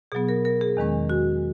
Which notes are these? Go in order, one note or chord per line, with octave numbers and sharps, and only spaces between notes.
B2 F#3 B3 G#4
A#4
A#4
G#4
E2 D#3 G#3 C#4
F#4